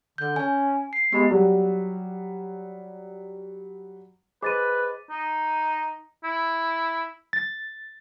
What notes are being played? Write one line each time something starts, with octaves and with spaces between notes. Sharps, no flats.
D3 G6
C#4 G#5
C7
G#3 B3 G4 B5
F#3 G3
G#4 B4 C5 D#5 D6 A6 D#7
D#4
E4
A6